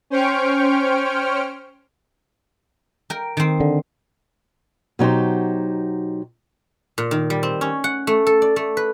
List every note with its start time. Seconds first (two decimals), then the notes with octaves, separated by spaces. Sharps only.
0.10 C#4 C5 G5 C#6 F6 D7
3.10 A#4 G5
3.37 D#3 C4
3.60 D3
4.99 B2 F#3 D#4 G4 C5
6.98 A#2
7.11 D#3
7.30 G3
7.43 C4
7.61 C#4
7.84 F#5
8.07 A3
8.27 A4
8.42 D5
8.56 A3
8.77 B4